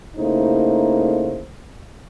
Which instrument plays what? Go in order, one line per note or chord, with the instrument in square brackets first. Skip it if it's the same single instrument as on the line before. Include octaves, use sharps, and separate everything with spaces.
[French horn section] C#3 A3 A#3 D#4 E4 C5